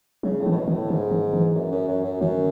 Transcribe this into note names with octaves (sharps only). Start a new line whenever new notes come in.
C#3 F#3
A2
E3
A2
B2
D#3
A2
G#2 D#3
D#3
E3
F#2
F#2
F#2
F#2
F#2 D#3